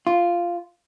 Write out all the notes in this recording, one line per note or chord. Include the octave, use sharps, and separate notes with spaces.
F4